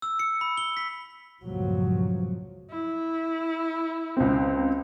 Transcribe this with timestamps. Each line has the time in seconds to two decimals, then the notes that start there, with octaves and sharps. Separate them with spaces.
0.02 E6
0.19 C#7
0.41 B5
0.57 G7
0.77 B6
1.42 C#2 G2 A#2 F3 F#3
2.71 E4
4.17 C#2 C4